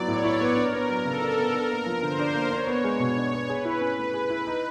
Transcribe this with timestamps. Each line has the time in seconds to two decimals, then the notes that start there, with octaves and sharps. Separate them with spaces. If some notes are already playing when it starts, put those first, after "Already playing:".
Already playing: F#3 B3 E4 D5
0.08 A2 C#5
0.24 E4
0.41 B3
0.57 D4 A#4
0.73 B3
0.89 F#3
1.05 C#3 A4
1.22 D4
1.37 B3
1.54 D4 A#4
1.71 A#3
1.86 F3
2.03 D3 C5
2.19 D4
2.35 A#3
2.51 D4 C#5
2.67 B3
2.84 G#3
3.00 B2
3.17 D4
3.33 B3
3.49 G#4 B4
3.65 E4
3.81 C#4
3.98 A3
4.14 G#4
4.30 E4
4.47 D#4